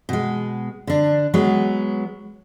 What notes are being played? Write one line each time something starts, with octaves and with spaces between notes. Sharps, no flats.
B2 G#3
D3 D4
F#3 G#3 B3